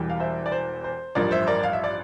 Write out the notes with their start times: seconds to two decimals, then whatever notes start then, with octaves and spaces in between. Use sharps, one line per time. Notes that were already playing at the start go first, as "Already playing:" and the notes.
Already playing: E1 E2 E3 G3
0.09 F5
0.20 C5 E5
0.46 D5
0.52 C5
0.84 C5
1.15 A1 G2 F3 A#4 D5
1.31 C5 E5
1.47 A#4 D5
1.63 F5
1.73 E5
1.84 D5